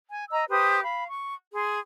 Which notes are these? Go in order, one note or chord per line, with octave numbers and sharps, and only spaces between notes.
G#5
D#5 A#5 E6
G4 B4 C5 D#6
F5 B5
C#6
G#4 C6